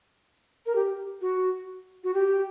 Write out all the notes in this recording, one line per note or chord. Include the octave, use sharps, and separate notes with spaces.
A#4
G4
F#4
F#4
G4